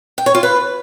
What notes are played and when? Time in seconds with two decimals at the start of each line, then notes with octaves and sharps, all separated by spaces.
0.18 G5
0.26 C#5
0.35 F4
0.43 B4